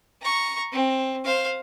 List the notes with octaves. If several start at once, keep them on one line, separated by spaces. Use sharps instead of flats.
A#5 C#6
C4
C5 F5